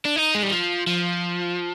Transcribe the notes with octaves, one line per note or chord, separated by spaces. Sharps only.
D4
D#4
G#3
G3
F3
F3